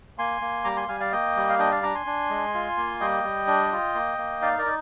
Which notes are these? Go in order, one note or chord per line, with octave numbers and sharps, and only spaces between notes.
A#3 G#5 C6
A#3
G3 A#5 D6
G#5 C6
G3 F5 G#5
D5 F5
A#3 D#5 G5
G3
F5
D4 D#5 G5
D5 F5
D4 A#5 D6
G#5 C6
D4
G#3
F4
A#3
G3 D#5 G5
G3
D4
F4
A#3
A#3
D#4 D5 F5
A#4 D5
D#4